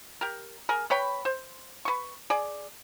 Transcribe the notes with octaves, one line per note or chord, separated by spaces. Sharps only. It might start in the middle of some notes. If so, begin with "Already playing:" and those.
G4 A#4
G#4 A#4
B4 C#5 G5 B5
C5
B4 C#6
G#4 D5